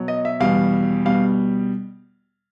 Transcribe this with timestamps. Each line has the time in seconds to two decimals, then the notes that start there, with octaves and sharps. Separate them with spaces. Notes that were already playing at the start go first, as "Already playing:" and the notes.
Already playing: B2 F#3
0.08 D#5
0.25 E5
0.40 E2 B2 G3 F5
1.05 B2 G3 F5